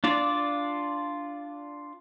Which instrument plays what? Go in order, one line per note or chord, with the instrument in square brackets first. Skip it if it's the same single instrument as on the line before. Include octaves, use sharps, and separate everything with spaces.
[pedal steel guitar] D4 F4 D5